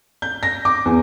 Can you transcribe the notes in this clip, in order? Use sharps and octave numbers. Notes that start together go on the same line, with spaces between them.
G6
A#6
D6
E2